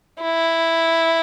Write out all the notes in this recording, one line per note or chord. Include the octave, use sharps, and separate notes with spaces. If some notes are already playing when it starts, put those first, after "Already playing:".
E4